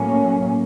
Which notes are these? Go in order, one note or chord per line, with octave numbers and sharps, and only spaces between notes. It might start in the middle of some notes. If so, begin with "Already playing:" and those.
Already playing: A2 F#3 A#3 C#4